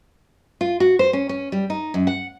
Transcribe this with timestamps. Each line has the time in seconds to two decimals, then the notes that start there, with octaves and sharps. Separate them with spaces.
0.61 F4
0.80 F#4
0.99 C5
1.13 C#4
1.29 C#4
1.52 G3
1.70 D#4
1.94 F#2
2.07 F#5